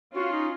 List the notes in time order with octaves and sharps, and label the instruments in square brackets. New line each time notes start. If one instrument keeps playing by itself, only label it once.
[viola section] C#4 F4 [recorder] F#4
[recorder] D#4